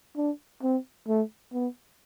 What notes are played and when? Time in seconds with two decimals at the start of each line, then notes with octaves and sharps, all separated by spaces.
0.17 D4
0.63 C4
1.08 A3
1.54 B3